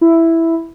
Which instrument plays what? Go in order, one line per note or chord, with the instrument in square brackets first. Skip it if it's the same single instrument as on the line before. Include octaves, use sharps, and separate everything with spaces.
[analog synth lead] E4